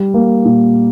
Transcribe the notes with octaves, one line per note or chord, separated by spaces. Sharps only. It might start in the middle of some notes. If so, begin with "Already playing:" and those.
Already playing: G3
A#3
A#2